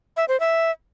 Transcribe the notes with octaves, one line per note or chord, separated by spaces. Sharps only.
E5
C5
E5